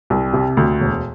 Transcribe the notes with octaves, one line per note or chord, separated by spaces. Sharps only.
C2
C3
D2
E1